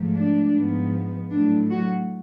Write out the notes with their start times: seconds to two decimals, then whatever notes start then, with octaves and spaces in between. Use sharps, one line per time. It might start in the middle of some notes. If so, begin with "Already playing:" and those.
Already playing: G#2 F3 A3
0.14 D4
0.53 G#2 F3 B3
1.31 A2 F#3 A3 D4
1.70 F#3 F#4